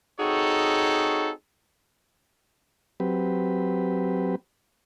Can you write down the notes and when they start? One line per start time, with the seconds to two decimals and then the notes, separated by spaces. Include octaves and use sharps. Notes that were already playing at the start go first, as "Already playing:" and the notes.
0.20 C4 D#4 F#4 G#4 A4 C#5
3.00 F#3 C4 G4 B4